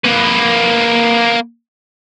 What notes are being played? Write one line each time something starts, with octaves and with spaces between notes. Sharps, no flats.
A#3 B4